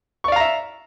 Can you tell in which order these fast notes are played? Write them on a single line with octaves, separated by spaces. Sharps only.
C#6 D5 F5 A#5 E5